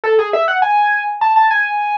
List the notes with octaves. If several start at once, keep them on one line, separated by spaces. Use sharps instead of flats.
A4
G#4
E5
F#5
G#5
A5
A5
G#5